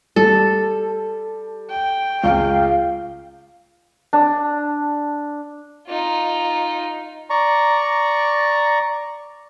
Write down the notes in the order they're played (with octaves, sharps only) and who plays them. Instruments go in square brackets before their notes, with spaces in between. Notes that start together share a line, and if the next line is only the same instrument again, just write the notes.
[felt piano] G3 [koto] A4
[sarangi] G5
[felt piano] C#2 [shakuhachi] F5
[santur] D4
[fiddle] D#4 F4
[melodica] D5 A#5 C#6